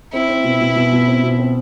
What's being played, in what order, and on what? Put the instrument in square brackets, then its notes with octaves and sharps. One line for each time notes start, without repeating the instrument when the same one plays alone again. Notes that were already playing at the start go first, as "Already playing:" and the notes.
[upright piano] C4 [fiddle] E4
[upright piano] C4
B2
B2
B2
B2
C4
B2
C4